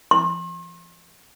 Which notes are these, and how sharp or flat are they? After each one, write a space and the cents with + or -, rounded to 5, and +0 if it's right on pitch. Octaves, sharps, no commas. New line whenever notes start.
C6 +45